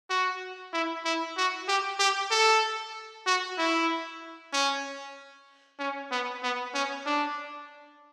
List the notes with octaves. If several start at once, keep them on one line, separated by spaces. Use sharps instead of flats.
F#4
E4
E4
F#4
G4
G4
A4
F#4
E4
C#4
C#4
B3
B3
C#4
D4